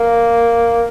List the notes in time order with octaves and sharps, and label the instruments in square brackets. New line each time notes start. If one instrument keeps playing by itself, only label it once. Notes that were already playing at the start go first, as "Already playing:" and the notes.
Already playing: [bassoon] A#3